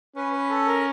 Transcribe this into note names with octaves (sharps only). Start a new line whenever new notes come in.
C#4 B4
B4
A4
A#4